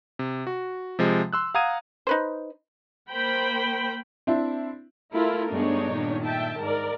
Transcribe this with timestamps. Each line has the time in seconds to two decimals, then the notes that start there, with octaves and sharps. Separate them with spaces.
0.19 C3
0.47 F#4
0.99 C3 F3 G#3
1.33 C6 E6 F#6
1.55 F5 F#5 A#5 D#6 G#6 D#7
2.07 D#4 B4 C5
3.09 A#3 C5 G5 B5
4.27 C4 D4 E4
5.13 A3 E4 F4 A#4
5.51 G2 G#3 B3 D4 D#4 C#5
5.85 A#2 D#3
6.24 E5 G5 A5
6.60 G#2 A#4 D5